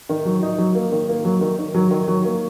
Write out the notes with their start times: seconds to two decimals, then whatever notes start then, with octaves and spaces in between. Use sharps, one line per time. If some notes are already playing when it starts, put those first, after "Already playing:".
0.09 D#3
0.25 F#3
0.43 D#4
0.58 F#3
0.75 A#3
0.92 D#3
1.09 A#3
1.25 F#3
1.41 D#3
1.59 D#3
1.75 F#3
1.91 D#3
2.08 F#3
2.24 A#3